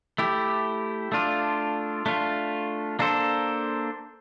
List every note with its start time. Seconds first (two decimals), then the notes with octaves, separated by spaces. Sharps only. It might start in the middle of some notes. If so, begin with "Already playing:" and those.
0.18 A3 E4 G4
1.12 A3 D4 F4
2.06 A3 D4 F4
2.99 A#3 D4 A4 C5